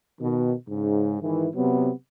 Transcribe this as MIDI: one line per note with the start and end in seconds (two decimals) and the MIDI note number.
0.21 0.53 47
0.21 0.53 51
0.69 1.16 44
0.69 1.16 49
1.21 1.48 44
1.21 1.48 51
1.21 1.48 52
1.55 1.91 48
1.55 1.91 54
1.55 1.91 59